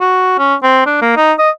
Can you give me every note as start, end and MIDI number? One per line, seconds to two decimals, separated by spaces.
0.01 0.37 66
0.38 0.55 61
0.63 0.83 60
0.86 0.97 62
1.02 1.17 58
1.17 1.32 63
1.39 1.50 75